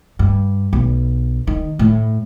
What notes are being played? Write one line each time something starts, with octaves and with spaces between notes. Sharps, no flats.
G2
B1
D#3
A2